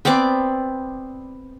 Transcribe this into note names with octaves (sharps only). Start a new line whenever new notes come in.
B3 C4 D5 D6